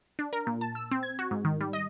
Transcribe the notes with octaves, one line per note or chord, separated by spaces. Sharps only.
D4
A#4
A#2
A5
E6
C4
G#6
F#4
G#2
D#3
G3
D#5